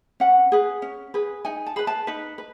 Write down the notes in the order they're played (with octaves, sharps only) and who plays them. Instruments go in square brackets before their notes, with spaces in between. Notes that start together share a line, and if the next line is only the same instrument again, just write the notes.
[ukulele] C#4 F#5
G#4 B4
C#4
G#4 B4
D#4 G#5
A5
G#4 B4 B5
A5
D#4 B4
B4